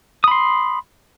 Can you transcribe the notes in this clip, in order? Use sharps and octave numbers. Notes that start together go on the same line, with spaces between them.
B5 C6 D#6